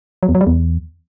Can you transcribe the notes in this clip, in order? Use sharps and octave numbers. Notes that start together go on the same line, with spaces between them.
F#3
E2
F#3
G3
E2